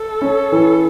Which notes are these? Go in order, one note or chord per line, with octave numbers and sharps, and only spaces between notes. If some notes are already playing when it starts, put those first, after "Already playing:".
Already playing: A4
C#4
E3